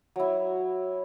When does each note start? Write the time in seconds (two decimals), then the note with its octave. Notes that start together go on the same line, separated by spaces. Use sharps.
0.16 F#3 E4